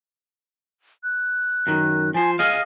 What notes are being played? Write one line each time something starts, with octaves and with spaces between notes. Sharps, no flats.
F#6
F#2 D#3
F3 C5 G#5
G#4 D#5 F5 F6